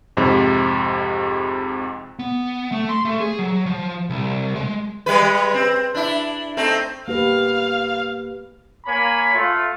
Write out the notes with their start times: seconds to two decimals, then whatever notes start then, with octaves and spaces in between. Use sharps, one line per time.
0.17 F2 G#2 C3
2.19 B3
2.72 A3
2.89 C6
3.05 A3
3.20 G#4
3.39 F#3
3.66 F3
4.10 C2
4.56 G#3
5.06 G3 G#3 B4
5.54 C4
5.95 D4 E4
6.57 A3 C4 D#4
7.08 A#3 G4 B4 F5
8.86 A#3 C#5 G#5 B5
9.34 A3 F4